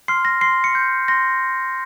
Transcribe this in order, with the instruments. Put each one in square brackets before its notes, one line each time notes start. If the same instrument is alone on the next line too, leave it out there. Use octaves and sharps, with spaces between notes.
[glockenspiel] C6 F6 C7
A#6
C6 C7
C#7
G6
C6 A#6